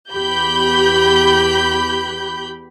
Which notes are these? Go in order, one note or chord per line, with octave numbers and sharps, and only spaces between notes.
E2 G4 B5 G6